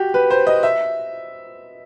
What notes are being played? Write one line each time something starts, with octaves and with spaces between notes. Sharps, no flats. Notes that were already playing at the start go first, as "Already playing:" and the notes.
Already playing: F#4 G4
B4
C5
D#5
E5